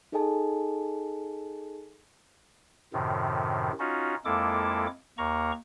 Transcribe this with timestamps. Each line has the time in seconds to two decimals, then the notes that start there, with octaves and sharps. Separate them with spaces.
0.12 D#4 G#4 A4 D#5 G#5 A5
2.93 F#2 A2 C3 D#3
3.79 C#4 D#4 F4 F#4
4.25 F2 G#3 A#3 E4 A4 D6
5.18 D#2 A#3 A#5 C#6